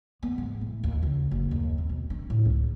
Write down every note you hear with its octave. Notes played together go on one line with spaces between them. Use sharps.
B3
G#2
A2
D#2
C#2
F#1
D#2
C4
B1
D4
A2
C#2